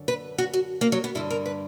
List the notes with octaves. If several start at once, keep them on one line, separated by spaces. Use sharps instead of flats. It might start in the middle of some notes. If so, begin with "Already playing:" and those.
Already playing: F#2 D3
B4
F#4
F#4
A#3
F#3
B3
G2 D3 E4
A#4
B4